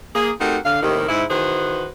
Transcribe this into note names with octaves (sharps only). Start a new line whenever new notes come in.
A#3 G#4
A3 C4 D#4 F#4 G4 A#4
D3 F5
D#2 A2 C3 D#3
G#2 E4
D#3 E3 F#4 G#4 B4 C5